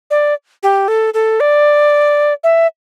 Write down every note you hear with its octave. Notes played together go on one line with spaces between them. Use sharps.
D5
G4
A4
A4
D5
E5